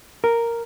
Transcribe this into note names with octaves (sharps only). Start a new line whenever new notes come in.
A#4